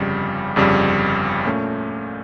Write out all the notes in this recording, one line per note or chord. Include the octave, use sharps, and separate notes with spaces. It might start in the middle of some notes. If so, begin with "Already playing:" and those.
Already playing: G1 F2 C#3 G3
G1 F2 C#3 G3
A#2 A3 C#4